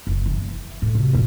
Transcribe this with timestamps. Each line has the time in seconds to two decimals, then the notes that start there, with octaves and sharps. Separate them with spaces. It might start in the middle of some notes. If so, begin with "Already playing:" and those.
0.07 F#1
0.26 E3
0.82 A2
0.95 C3
1.13 A1 F#2